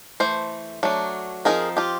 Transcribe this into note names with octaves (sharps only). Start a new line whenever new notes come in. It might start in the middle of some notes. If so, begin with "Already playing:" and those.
E3 A3 C5
F#3 A3 D4
F3 G#3 C4 D#4 G#4 A#4
F4 G4